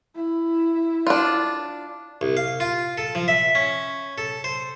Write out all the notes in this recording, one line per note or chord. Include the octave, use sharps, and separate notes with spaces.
E4
D4 F4
C2
F5
F4
A4
F3
E5
C#4
A4
C5